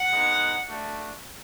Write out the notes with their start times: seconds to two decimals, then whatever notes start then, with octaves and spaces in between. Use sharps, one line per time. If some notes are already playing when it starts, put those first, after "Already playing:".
Already playing: F#5
0.10 G#3 B3 D#4
0.67 A3 D4 F#4